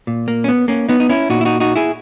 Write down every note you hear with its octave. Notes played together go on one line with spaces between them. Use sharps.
A#2
A#3
C#4
B3
A#3 C#4
B3 D#4
D#4
C#4 E4
A#2 D#4 F#4
E4
D#4 F#4
D#4 F#4
E4 G#4